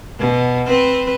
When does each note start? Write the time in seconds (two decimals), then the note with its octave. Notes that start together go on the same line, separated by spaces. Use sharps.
0.19 B2
0.67 C4 B4